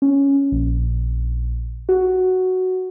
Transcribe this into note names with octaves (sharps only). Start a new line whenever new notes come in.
C#4
A#1
F#4